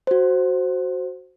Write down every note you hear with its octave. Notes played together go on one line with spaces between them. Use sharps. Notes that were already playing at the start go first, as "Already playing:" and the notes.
F#4 C5